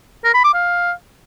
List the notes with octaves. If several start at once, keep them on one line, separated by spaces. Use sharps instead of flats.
A#4
B5
D6
F5